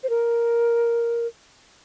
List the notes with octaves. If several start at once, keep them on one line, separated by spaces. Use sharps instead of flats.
C5
A#4